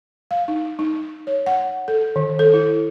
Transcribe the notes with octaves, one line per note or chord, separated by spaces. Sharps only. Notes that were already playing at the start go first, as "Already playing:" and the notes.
F5
D#4
D#4
C#5
F#5
A4
D#3
A4
E4